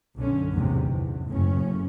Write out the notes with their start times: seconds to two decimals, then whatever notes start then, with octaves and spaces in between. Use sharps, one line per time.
0.16 B1 F#2 D3 C#4
0.52 A1 E2 G#2 C3
0.86 E2
1.29 F#1 A2 C#4